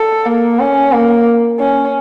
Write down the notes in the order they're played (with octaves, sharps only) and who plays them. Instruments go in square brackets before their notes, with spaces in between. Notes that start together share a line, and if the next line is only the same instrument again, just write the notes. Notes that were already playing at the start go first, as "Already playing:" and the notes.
Already playing: [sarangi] A4
A#3
C#4
A#3
C#4